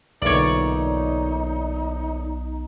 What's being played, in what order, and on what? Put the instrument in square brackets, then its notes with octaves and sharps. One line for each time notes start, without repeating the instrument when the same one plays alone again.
[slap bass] B1 [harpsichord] E2 A#2 D3 [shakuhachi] D#4 [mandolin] C#5 D5